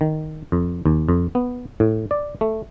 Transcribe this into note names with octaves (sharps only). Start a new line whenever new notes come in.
D#3
F2
D#2
F2
B3
A2
D5
A3